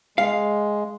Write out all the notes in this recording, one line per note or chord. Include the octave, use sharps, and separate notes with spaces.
G#3 F5